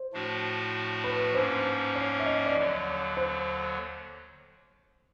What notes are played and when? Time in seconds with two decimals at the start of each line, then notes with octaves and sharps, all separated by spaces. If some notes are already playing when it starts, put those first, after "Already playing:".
Already playing: C5
0.13 A2 F3 A3 D4 F#4
1.04 B4
1.35 G#2 F3 A#3 C#4 C5
1.95 C#5
2.20 E5
2.26 D#5
2.46 D5
2.56 D#2 D3 F#3 C#5
3.17 C5